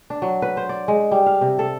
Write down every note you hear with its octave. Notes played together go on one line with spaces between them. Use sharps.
D4
F#3
B4
C5
D5
G#3
G3
F5
C3
A4